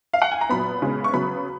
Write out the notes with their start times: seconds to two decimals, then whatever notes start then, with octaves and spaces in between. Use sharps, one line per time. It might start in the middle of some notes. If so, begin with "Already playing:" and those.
0.13 F5
0.22 F#5
0.32 G#5
0.41 A#5
0.49 A#2 F#3 B3 B5
0.82 C#3 G#3 B3
1.04 C#6
1.13 C#3 F#3 B3 B5